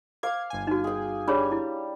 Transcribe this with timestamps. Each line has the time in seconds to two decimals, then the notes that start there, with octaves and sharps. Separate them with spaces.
0.23 F5 D6 G#6
0.50 G1 G#5
0.67 D#4 F#4
0.84 G#4 G5
1.28 G3 D4 G#4 C#5
1.52 E4